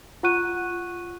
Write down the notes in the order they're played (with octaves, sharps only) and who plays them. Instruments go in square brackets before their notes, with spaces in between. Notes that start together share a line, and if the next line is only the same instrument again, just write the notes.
[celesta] F4 F#5 C#6 F#6 D#7